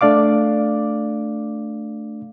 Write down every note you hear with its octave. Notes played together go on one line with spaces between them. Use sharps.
A3 D4 D5 F5 D6